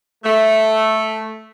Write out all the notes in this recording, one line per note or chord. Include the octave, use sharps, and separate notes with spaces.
A3